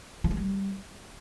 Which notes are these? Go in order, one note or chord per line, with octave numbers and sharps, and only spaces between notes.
F3
G#3
G3